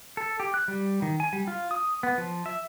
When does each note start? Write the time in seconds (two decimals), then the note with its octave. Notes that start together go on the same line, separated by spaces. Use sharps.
0.17 A4
0.40 G4
0.54 F#6
0.68 G3
1.02 D#3
1.20 G#5
1.33 G3
1.48 F4
1.71 D#6
2.03 B3
2.18 F3
2.46 E5